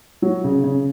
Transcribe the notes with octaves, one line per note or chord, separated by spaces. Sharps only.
F#3
C#3
C#3